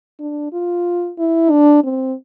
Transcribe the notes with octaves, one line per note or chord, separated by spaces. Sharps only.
D4
F4
E4
D4
C4